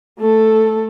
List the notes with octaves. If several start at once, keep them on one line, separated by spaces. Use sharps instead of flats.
A3 A4